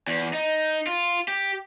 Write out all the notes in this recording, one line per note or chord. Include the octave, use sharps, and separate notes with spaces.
E2
D#4
F4
G4